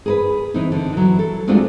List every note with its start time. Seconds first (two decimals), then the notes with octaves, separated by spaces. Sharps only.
0.06 G#4 A#4 B4
0.54 E3 C4 D#4
0.72 D3
0.93 E3 F#3
1.19 A4
1.48 G#3 A3 C4 D4 F4 F#4